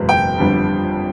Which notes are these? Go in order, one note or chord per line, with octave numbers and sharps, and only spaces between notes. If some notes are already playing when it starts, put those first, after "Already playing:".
Already playing: F#1 E2 B2 G#3
G5
G1 F2 D3 G3